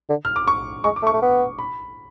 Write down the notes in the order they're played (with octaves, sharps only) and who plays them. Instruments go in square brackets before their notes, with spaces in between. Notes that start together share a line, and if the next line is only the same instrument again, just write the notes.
[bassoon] D3
[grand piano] F6
D6
C#6
[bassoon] G#3 [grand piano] C#6
[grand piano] D6
[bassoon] A3
[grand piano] C#6
[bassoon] A3
B3
[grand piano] B5